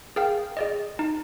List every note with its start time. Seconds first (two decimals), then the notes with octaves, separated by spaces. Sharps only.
0.16 G#4 A#4 F5 G5
0.57 G#4 D5 D#5
0.99 D#4